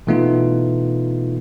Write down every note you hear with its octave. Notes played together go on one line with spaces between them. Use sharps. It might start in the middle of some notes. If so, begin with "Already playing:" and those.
B2 E3 A3 B3 D#4 F4